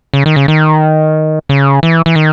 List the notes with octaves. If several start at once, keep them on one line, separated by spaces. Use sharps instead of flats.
C#3
D#3
C#3
D#3
C#3
E3
E3
D#3